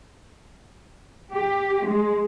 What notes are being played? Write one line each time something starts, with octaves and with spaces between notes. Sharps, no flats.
G4
G#3